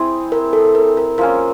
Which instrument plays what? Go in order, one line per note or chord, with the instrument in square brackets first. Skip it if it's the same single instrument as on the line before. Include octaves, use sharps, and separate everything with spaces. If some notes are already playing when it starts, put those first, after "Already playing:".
Already playing: [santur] C4 E4 G#4
[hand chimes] A#4
A4
A#4
A#4
[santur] F3 A#3 C#4 [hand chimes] A#4